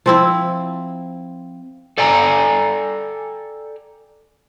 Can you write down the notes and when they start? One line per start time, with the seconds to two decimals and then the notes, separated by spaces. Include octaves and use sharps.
0.06 F3 C4 E4
1.98 A4 D5 G5 G#5 A#5